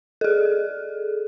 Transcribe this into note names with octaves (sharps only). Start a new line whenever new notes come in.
G#4 A4